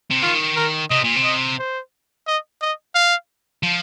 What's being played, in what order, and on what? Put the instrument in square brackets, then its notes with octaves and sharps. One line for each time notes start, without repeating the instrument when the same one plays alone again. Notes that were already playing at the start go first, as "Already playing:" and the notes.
[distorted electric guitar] C3
[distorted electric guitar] D#3 [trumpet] F4
[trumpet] A#4
[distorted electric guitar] C3 [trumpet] D#5
[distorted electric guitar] A#2
C3
[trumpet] D#5
C5
D#5
D#5
F5
[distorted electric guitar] F3